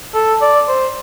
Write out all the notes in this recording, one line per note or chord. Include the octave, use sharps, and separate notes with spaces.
A4
D5
C5